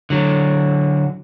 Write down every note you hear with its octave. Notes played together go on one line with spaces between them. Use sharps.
D3 F#3